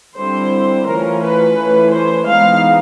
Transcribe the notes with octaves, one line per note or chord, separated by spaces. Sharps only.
D3 G3 C4 E4 C5
E3 A3 C#4 F4 A#4
B4
E3 A3 C#4 E4
C5
E3 G#3 B3 D#4 F5